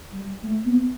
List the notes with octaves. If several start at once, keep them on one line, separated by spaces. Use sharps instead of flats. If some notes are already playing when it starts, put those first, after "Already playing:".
G3
A3
B3